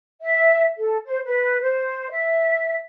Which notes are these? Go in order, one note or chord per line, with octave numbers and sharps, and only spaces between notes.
E5
A4
C5
B4
C5
E5